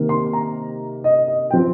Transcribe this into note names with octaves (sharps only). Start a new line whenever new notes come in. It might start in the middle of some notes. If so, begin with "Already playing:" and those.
Already playing: C3 D#3 A#3
C6
A#5
D#5
D#5
F3 C4 G5